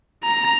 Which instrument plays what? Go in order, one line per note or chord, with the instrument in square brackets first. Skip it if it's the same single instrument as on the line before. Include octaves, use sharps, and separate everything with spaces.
[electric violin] A#5